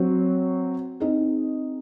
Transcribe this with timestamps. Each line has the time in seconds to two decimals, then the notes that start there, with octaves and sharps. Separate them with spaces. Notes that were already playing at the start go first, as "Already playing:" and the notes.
Already playing: F#3 C4 F#4
1.00 C4 D#4 G#4 D#5